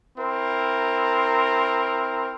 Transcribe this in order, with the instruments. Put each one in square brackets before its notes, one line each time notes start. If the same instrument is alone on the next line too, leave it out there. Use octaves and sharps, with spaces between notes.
[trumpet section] C4 E4 A#4